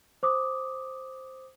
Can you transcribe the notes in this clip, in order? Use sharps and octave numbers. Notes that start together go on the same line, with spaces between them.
C5 D6 D#6